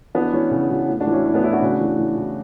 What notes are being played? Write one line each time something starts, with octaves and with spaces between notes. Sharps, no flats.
E3 B3 D4
E3 C#4
C#3
E3
A2
D4 F#4
E3
C#4 E4
A2 C#4
B3 D4
A2 C#4 E4
D4 F#4
C#3
E3
E3
E3